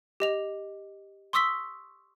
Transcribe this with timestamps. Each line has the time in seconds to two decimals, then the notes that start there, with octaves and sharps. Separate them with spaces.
0.20 G4 D#5 F7
1.33 C6 C#6 D#6 E6 B6 G7